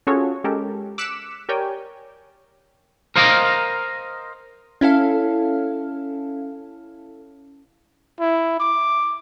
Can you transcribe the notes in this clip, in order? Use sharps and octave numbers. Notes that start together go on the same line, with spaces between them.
C#4 F4 F#4 G#4 A4 C#5
G#3 C#4 G4 A4 A#4
D6 E6 F#6 B6 C#7 E7
G4 A#4 C#5 D5 G5 G#5
A#4 C5 D#5 F5 G#5 A#5
C#4 E4 A4 F5
E4
D6